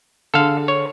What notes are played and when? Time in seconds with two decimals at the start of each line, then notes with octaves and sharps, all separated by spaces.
0.34 D3 G#4 A4 F5
0.68 C#5